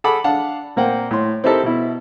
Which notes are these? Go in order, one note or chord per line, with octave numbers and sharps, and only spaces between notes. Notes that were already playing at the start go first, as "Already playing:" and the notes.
G#4 A4 F#5 B5 D6
D4 F5 F#5 A5
A#2 A#3 C4 F#5 G5
A2 C6
C4 D#4 E4 G4 A4 A#4
B2 E4